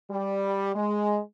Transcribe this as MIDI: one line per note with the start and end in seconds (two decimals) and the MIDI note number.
0.10 0.73 55
0.75 1.19 56